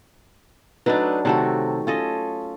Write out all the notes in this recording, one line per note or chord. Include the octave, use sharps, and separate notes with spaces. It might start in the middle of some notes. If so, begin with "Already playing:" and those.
F#3 A3 D4 D#4 B4
C3 D#3 A3 F#4 A4
C#4 F4 A4 D#5